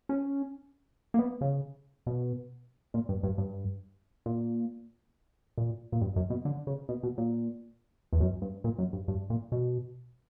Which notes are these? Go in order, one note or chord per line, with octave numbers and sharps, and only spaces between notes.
C#4
A#3
B3
C#3
B2
A#2
G2
G2
G2
A#2
A#2
A#2
G2
F#2
B2
D3
C#3
B2
B2
A#2
E2
F#2
G2
A#2
F#2
G2
G2
A#2
B2